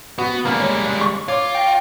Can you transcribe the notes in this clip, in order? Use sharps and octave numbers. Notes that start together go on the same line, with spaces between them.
B3 F#4
G3 G#3 A#3
C#5
C#6
F4 C#5 D6
G5 A#6